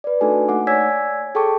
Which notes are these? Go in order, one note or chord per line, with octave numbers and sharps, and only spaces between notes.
B4 D5
A3 D4 D#4 F#4 A4 G#5
A3 A#3 D#4 F#5 D6
C#5 D5 G#5 E6 G#6 B6
G#4 A4 G5 A5 C#6 D6